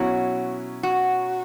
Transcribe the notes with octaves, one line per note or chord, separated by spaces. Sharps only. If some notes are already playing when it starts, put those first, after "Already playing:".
Already playing: B2 F#3 C#4 E4 F#4
F#4